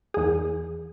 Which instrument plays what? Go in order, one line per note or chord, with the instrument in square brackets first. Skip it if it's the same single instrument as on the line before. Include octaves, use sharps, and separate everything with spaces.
[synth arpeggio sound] E2 G#4